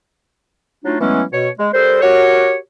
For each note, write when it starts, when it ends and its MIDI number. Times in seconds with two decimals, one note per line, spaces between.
0.85 1.00 54
0.85 1.00 57
0.85 1.00 62
0.85 1.00 63
0.85 1.00 65
1.00 1.23 52
1.00 1.23 54
1.00 1.23 56
1.00 1.23 57
1.00 1.23 59
1.00 1.23 61
1.33 1.49 47
1.33 1.49 73
1.59 1.68 56
1.74 2.02 55
1.74 2.02 69
1.74 2.02 70
1.74 2.02 72
2.02 2.57 66
2.02 2.57 67
2.02 2.57 70
2.02 2.57 73